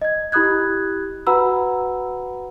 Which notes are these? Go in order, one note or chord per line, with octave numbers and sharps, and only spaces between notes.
D#5 G#6
E4 G4 B5 D#6 F#6 G#6
F#4 B4 F#5 A#5 B5 E6